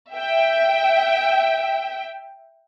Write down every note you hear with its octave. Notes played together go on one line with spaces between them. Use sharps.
E5 G5